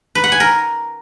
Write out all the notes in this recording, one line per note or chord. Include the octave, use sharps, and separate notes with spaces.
B4
F#5
G#5
A#4